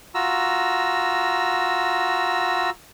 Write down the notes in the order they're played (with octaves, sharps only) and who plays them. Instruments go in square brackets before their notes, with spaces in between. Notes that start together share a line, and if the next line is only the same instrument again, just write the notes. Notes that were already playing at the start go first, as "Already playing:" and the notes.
[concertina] F4 F#4 A#5 E6